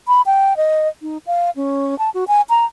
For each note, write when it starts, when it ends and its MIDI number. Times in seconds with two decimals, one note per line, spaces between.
0.08 0.22 83
0.26 0.57 79
0.57 0.88 75
1.02 1.18 63
1.27 1.50 77
1.56 1.97 61
1.99 2.10 81
2.14 2.24 66
2.28 2.42 80
2.49 2.65 82